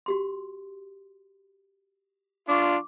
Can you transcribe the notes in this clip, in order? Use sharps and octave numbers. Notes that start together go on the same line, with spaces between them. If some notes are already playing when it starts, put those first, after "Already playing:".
F#4 G4 C6
D4 F4 C#6 D6